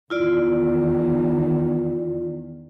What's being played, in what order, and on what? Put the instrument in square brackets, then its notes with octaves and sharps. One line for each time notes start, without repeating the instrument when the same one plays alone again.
[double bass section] E2 D#3 [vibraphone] E4 F4 D5